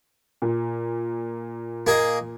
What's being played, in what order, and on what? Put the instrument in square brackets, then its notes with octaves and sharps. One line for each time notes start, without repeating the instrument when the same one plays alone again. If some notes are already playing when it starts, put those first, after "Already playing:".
[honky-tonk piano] A#2
[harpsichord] A#3 G#4 D#5